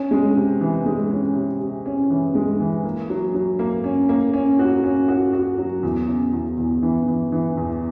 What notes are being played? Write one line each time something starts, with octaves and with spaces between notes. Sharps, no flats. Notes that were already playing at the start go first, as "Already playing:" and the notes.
Already playing: C#4
G#3
C3
E3
G#3
C#4
C3
C3
C#4
E3
G#3
E3
A#3
F#3
F#3
A#3
C#4
A#3
C#4
F#4
C#4
F#4
F#4
F#3
E2
C#3
E2
E2
E3
E3
E3
E2